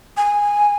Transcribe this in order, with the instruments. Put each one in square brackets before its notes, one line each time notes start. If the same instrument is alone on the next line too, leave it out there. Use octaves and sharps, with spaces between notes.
[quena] G#5